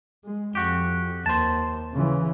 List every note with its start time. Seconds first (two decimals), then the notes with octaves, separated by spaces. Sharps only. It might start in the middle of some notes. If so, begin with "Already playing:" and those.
0.25 G#3
0.55 F2 F#4 G4
1.26 D#2 C5 A5
1.93 C#3 E3